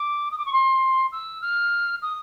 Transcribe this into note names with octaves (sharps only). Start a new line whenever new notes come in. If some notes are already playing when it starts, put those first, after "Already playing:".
Already playing: D6
D#6
D6
C#6
C6
E6
F6
D#6